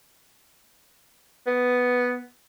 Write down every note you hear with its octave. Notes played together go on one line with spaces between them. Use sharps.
B3